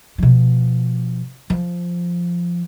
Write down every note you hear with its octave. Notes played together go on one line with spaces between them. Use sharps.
B2 F3
F3